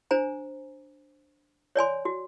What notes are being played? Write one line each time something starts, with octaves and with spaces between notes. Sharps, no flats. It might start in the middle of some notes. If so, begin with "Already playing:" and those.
D4 C5 G#5 A#5
C#5 D5 G#5 C6
F#4